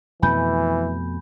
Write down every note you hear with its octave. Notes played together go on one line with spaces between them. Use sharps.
F2 B2 E3 A3 G#5 B5 G6